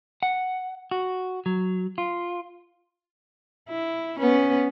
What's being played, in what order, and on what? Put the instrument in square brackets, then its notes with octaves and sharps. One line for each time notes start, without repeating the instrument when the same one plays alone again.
[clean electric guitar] F#5
F#4
F#3
F4
[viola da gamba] E4
B3 C#4 B4